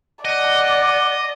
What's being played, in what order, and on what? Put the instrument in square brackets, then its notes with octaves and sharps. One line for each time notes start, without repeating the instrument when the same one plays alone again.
[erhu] D5 [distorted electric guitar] D#5 [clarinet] F#5